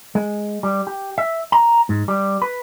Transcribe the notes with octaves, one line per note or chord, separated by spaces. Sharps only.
G#3
G3
G4
E5
A#5
G#2
G3
B4